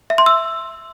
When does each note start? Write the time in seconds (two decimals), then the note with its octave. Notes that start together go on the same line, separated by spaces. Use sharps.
0.10 E5
0.18 C6
0.26 E6